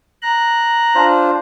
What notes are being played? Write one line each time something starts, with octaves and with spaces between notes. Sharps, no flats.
A#5 F#6
D4 F4 C5